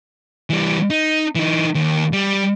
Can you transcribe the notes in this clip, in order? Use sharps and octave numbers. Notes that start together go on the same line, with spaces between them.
E3 G3
D#4
E3 D#4
D#2
G3